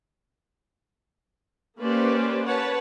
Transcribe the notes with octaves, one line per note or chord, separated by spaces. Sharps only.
A#3 C#4 G4 B4 C5 D5
B4 C#5 F#5 A5